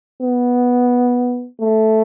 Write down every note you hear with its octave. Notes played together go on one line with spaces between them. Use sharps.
B3
A3